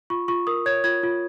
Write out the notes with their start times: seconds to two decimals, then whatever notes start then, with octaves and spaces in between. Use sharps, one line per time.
0.10 F4 C#6
0.28 F4 C#6
0.47 A#4 D#6
0.66 C#5 G#6
0.84 F4 G#6
1.03 F4